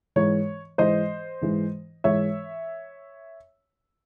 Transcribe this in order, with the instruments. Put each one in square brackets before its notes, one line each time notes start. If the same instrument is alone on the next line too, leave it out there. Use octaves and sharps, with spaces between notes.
[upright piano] G#2 E3 G#3 C#5
G#2 E3 G#3 C5 D#5
G#2 E3 G#3
G#2 E3 G#3 C#5 E5